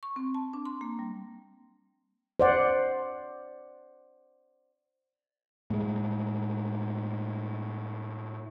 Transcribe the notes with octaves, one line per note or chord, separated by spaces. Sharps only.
C#6
C4
A5
D4
C6
A#3
G3
C5 D5 F#5
A2 G#3